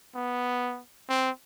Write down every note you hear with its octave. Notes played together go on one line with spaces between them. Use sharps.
B3
C4